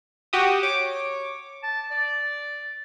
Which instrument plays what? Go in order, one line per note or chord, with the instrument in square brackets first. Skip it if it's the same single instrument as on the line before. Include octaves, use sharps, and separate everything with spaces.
[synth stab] F#4 G4 D#6
[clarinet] C#5 [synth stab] D6
[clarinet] A5
D5